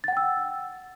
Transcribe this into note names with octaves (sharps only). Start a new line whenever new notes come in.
F#5 G5 E6 A6